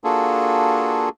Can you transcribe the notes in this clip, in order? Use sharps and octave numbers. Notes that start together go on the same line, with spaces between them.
A#3 D4 F4 F#4 G#4 A4